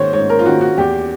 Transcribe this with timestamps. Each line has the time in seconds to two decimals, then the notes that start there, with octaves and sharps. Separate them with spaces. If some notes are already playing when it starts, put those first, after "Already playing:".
Already playing: G#2 D#3 C5 C#5
0.13 G#2 C#5
0.29 A#4
0.39 F4
0.45 D#3 F#4
0.61 F#4
0.77 E2 G4